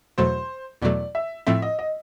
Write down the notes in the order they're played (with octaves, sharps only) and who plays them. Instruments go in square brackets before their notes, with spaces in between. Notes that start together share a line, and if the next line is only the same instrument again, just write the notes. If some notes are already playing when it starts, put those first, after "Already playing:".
[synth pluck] E2 B2 F#3 A3 [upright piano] C5
[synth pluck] E2 B2 F#3 A3 [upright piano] D5
[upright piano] E5
[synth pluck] A2 F3 A3 C4 [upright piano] E5
[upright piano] D#5
D#5